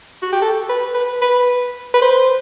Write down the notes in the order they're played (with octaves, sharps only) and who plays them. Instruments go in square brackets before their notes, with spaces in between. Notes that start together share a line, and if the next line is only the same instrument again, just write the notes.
[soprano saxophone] F#4
G4
A4
B4
B4
B4
B4
C5